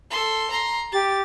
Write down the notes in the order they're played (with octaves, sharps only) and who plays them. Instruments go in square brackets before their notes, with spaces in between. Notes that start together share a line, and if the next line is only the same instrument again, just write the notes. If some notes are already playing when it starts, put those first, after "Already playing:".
[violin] A4 C6
A#5 C6
[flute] G4 [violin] A6